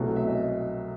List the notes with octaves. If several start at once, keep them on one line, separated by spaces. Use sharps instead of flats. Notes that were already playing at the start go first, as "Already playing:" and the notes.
Already playing: C2 B2 F#3 A3
E5
D#5